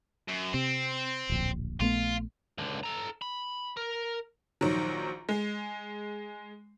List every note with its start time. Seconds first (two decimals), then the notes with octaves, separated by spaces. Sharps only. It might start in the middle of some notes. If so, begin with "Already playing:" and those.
0.29 F#2
0.54 C3 C4
1.30 D1 A#1
1.80 A#1 A3 B3 F4
2.58 C#2 D3
2.83 A4 A#5
3.22 B5
3.77 A#4
4.61 A#1 D#3 F#3
5.29 G#3